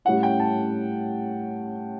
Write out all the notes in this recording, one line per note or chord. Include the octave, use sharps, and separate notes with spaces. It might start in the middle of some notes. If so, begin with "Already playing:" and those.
A2 G3 C#4 E4 F#5
G5
A5